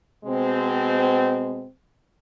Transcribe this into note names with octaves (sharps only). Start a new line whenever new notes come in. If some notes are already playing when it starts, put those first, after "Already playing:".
B2 G#3 C4